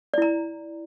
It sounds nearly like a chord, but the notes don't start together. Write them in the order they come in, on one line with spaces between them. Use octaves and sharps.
D5 E4 A#5